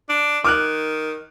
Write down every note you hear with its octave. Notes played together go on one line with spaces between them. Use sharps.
D4
D#3 D6 F6 F#6